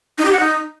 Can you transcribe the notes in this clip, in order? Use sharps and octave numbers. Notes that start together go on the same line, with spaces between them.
D#4
G4
F#5
D#4